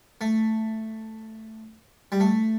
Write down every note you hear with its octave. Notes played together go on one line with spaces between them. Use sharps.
A3
G3
A3